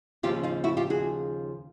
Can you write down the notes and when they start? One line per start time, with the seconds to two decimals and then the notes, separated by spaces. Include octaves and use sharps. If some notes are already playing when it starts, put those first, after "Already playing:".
0.23 D#2 C#3 F3 F4 G4
0.43 D#4 F4
0.64 E4 F#4
0.77 F4 G4
0.90 F#4 G#4